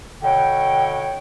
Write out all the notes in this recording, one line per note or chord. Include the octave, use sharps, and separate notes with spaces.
B2 D3 C#5 G5